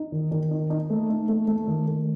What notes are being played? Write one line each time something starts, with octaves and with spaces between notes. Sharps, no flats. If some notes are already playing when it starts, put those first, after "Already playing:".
Already playing: D#4
D#3
D#3
D#4
D#4
A3
D#4
A3
A3
D#3
A3